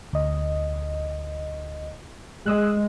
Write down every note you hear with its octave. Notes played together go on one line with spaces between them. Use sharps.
D2 D#5
G#3 D#6 E6 F#6